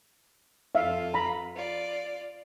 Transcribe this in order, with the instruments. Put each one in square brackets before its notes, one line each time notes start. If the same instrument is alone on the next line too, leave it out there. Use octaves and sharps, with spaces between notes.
[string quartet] F2 F4 A4 [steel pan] E5 F5
[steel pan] A#5 B5
[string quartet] F4 D5